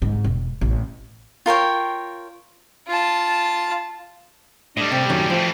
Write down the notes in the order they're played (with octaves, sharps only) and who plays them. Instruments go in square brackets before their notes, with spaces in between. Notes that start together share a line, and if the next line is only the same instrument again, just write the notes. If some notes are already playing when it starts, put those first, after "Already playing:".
[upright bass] G#2
E1
A1
[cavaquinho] F4 A#4 C#5 G5
[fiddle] F4 A5
[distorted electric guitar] A2 G3 [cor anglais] D4 [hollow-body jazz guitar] D#5
[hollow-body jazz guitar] C3 [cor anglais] G5
[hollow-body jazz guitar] F#2 D#3 C#4
[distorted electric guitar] A2 E3 [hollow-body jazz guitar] F3